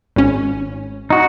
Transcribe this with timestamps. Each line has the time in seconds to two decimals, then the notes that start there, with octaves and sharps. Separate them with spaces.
0.16 G#1 C#4
1.10 D#4 F#4